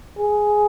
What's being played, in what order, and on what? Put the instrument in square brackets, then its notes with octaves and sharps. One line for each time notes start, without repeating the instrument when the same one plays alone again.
[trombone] G#4